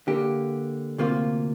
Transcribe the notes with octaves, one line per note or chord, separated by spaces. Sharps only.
D3 A#3 G4
D2 C3 A#3 F4